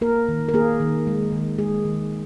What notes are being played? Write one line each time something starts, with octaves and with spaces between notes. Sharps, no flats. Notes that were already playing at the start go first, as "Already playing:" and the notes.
A#3 A#4
D#3
A#4
A#3 G#4
D#3
G#3
D#3
G#3 G#4
D#3